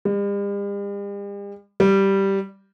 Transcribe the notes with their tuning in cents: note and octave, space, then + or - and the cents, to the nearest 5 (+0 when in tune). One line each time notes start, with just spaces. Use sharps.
G3 +45
G3 -5